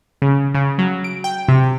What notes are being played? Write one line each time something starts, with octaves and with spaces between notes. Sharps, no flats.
C#3
C#3
F#3
D7
G5
C3